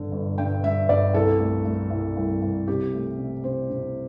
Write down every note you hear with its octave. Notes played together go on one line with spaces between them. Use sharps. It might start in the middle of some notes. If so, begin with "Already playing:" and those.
Already playing: G1 D3
G1
G2 G5
G2 E5
G1 D5
C2 A4
A3
A3
C2
C2
C2
C3 G4
A3
C3
C3 C5
C3